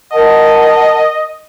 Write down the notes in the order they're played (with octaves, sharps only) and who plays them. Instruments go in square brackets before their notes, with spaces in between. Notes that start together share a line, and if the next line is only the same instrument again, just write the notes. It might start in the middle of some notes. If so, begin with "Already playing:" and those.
[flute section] A#4 F#5 A5 [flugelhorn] D#5